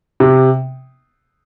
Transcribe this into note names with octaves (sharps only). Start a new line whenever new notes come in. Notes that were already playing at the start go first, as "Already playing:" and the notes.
C3